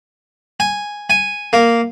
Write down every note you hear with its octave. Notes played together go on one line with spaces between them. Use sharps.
G#5
G#5
A#3